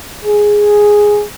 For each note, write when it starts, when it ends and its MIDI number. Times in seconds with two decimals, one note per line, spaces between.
0.25 1.23 68